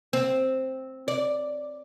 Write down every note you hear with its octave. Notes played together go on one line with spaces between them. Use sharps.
C4
D5